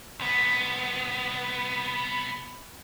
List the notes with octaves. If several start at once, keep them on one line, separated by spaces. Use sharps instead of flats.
C2 B3